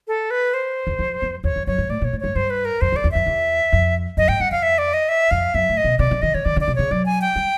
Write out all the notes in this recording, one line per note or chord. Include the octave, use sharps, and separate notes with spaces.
A4
B4
C5
E2
F2
F2
E2 C#5
F2
F#2 C#5
G#2
A2 D5
A#2 C#5
A2
G2 C#5
G2 C5
B4
A#4
F2 C5
E2
D5
E2
F2 E5
E2
F2
F#2 D#5
G#2 G5
G2 F#5
F2 F5
E5
D5
D#5
E5
F2 F5
F#2 E5
A2
D#5
B2
C3 D5
D3
D#3 D#5
E3 C#5
D#3 D5
D3
D5
C3
C#3 C#5
F#3 D5
G#5
G5
G3